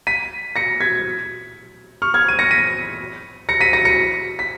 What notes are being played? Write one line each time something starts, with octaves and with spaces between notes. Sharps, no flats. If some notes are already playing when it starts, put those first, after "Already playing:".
B6 D#7
A#6 C#7
G#6 B6
C#6 F6
F6 G#6
D#7
A#6 C#7
B6 D#7
A#6 C#7
B6 D#7
A#6 C#7
A#6 C#7
B6